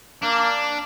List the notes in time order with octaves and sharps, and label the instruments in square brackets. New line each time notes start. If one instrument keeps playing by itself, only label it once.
[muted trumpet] A#3 [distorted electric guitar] D4